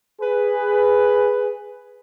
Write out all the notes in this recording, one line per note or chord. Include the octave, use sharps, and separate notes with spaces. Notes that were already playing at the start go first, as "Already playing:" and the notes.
G#4 B4